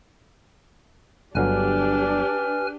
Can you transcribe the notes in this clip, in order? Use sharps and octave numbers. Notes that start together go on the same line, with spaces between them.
G1 D3 F#3 D4 G4 B4 G#5 F6